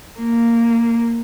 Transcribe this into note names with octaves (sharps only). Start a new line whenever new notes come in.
A#3